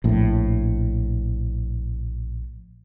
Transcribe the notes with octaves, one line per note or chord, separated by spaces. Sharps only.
A#1 A2